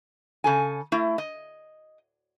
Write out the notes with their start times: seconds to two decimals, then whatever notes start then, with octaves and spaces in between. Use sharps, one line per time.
0.44 C#3 A4 G#5
0.92 A3 E4
1.18 D#5